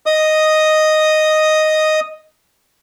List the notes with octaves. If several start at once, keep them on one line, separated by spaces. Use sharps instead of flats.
D#5 D#6